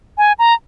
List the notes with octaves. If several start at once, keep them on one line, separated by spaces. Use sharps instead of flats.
G#5
A#5